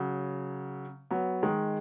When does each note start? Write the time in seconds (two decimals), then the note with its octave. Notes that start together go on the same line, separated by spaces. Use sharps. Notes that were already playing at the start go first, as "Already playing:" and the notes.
Already playing: C#3 F#3
1.11 F#3 B3
1.43 D#3 G#3